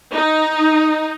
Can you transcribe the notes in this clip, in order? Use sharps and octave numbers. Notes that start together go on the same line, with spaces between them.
D#4